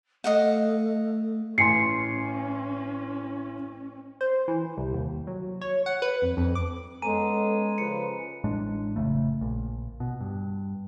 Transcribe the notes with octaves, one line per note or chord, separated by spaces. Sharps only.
A3 D#5 F5 F#5
A1 C#4 G#5 C6 C7 C#7
C5
E3
C2
D#2
F#3
C#5
F#5
B4
F2
F2
D6
G#3 B3 C#4 A4 G#5 A#5 D#7
C#3 F3 B4 C#7
A1 A2 G#3 D4
F1 D#2 C#3 A3
A#1
B2
G2